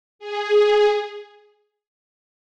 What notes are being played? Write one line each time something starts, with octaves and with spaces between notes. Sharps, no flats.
G#4